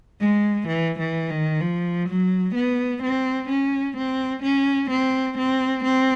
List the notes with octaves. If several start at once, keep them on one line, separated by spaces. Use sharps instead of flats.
G#3
E3
E3
D#3
F3
F#3
B3
C4
C#4
C4
C#4
C4
C4
C4